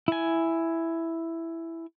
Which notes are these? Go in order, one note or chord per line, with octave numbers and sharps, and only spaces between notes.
E4 G#5